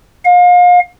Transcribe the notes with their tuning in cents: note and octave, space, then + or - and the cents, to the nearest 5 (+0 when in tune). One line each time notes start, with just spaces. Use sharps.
F5 +35